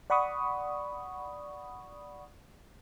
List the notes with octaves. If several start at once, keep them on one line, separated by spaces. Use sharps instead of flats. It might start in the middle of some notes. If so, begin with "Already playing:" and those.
D5 F#5 B5 C#6 D#6